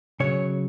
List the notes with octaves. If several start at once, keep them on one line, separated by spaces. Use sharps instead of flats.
C#3 F#3 C#5